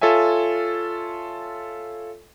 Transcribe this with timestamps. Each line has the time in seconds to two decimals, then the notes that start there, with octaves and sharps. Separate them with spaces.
0.01 F4 A4 C#5 E5 G#5